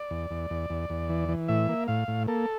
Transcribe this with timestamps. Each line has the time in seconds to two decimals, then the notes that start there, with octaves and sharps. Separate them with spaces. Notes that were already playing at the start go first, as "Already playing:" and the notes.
Already playing: D5
0.11 E2
0.31 E2
0.50 E2
0.70 E2
0.90 E2
1.09 E3
1.29 E3
1.48 A2 E5
1.69 A#3
1.88 A2 F5
2.08 A2
2.27 A#3 A4